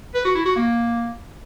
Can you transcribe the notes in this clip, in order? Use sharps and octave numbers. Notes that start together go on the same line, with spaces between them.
B4
F#4
E4
F#4
A#3